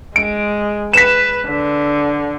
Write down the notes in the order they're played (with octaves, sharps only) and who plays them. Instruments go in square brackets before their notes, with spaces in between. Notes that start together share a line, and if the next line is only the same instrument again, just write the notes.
[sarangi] G#3 [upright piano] D7
[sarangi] B4 [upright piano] B6 E7
[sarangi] D3